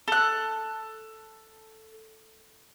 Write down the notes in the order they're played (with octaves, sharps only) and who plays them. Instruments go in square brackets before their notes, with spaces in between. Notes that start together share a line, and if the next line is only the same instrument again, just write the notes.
[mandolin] A4 F#6